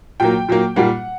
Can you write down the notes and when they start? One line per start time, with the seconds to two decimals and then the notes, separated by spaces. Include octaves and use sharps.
0.20 A#2 F#3 A#3 G5
0.48 A#2 F#3 A#3
0.76 A#2 G3 A#3 F#5